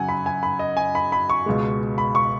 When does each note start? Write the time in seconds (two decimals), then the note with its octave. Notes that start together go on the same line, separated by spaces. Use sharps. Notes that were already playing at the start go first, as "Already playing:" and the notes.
Already playing: F#2 C#3 F#3 F#5 G#5
0.09 B5
0.26 G#5
0.43 B5
0.59 D#5
0.77 G#5
0.95 B5
1.12 B5
1.30 C#6
1.46 C#2 B2 G#3
1.98 B5
2.15 C#6